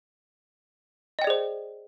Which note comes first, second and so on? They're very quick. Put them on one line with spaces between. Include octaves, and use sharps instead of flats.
D#5 G5 D5 G#4 C5